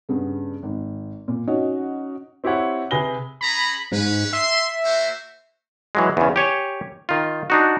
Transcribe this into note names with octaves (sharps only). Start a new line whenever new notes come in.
G2 C#3 B3
G#1
A#2
C#4 D#4 F#4 C#5 D#5
C4 E4 G4 C#5 F#5
C3 G#4 B4 A#6 G7
C#4 G#4 A#5 B5
G#2 C#4 B4
E5 C6
A#3 F#4 C5
E3 F#3 G#3
E2 C#3
G4 C#5 G#5
D#3 F4
D4 D#4 F#4